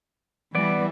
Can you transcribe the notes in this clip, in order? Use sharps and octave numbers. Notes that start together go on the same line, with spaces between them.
E3 G3 B3 D5